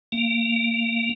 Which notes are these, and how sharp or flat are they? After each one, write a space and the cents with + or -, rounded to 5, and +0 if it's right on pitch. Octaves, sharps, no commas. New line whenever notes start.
A#3 -20